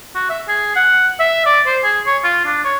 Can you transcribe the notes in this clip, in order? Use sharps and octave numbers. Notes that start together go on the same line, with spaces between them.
F#4
E5
G#4
F#5
E5
D5
C5
G#4
C#5
F4
D4
C#5